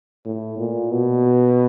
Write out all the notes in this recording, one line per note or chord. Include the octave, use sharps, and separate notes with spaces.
A2
A#2
B2